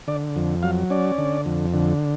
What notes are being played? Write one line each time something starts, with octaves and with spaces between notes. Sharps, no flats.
D3 D5
F2
F#3 F5
C#4 D5
D3
F2
D3